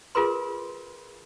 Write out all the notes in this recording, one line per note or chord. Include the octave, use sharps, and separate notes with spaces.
F4 G#4 A#4 B4 C6